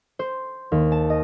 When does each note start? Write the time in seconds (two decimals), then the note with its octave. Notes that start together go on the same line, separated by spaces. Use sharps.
0.19 C5
0.72 D#2
0.92 A5
1.10 D#5